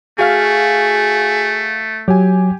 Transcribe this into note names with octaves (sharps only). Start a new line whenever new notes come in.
A3 F#4 G#4 F5 F6
F#3 G4 G#5